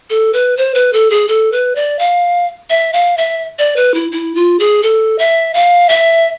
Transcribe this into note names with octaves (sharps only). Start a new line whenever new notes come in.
A4
B4
C5
B4
A4
G#4
A4
B4
D5
F5
E5
F5
E5
D5
B4
E4
E4
F4
G#4
A4
E5
F5
E5